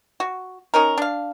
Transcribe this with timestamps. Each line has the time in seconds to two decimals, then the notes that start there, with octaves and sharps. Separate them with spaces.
0.20 F#4
0.74 C#4 D#4 A#4
0.98 D4 F5